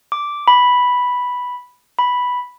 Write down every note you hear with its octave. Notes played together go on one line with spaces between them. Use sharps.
D6
B5
B5